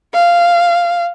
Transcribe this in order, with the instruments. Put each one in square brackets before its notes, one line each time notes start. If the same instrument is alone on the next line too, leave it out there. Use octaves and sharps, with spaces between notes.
[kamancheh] F5